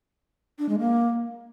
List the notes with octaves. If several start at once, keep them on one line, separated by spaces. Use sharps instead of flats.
D4
G#3
A#3